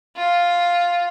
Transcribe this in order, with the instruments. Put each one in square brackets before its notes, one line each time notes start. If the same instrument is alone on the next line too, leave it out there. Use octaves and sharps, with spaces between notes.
[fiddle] F4